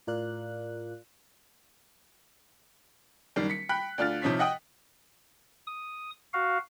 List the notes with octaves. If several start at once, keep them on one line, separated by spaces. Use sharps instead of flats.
A2 F4 A#4 D5 F5 F#6
F#1 D#3 G3 C7
B6 C#7
G5 B5 F#6 B6
D2 D4 F4 F6 A6
C3 F3 D#4 C#5 B6
D#5 F#5 G5 D#6
D#6
F#4 F5